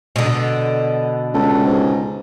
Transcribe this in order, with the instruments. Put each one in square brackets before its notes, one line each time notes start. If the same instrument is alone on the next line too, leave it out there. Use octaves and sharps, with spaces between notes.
[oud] B2 D3
[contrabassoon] C#2 [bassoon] A4
[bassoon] G#2